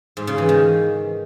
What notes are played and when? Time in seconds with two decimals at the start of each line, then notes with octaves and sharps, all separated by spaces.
0.17 G#2
0.27 C#3
0.38 E3
0.49 D#3